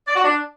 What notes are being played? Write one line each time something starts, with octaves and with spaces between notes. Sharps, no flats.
D5
F#4
D4